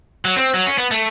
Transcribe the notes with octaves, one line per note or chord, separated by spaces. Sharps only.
F#3
C4
F#3
C#4
B3
A3